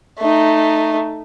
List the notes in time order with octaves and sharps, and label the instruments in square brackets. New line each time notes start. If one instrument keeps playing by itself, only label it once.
[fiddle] A3 D#4